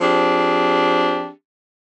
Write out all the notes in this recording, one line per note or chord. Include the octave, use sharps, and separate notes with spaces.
F3 C4 D4 G4 G#4